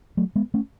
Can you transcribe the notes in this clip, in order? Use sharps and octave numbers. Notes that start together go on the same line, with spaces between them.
F#3 A3
G#3 B3
A3 C#4